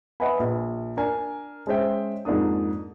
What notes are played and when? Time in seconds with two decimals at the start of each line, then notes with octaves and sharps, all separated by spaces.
0.20 B4 D#5 E5 F#5 G#5 B5
0.39 A#1
0.97 D4 A#4 G#5
1.67 G#3 C#4 C5 E5 G5
2.25 F2 G#2 A#3 D4 D#6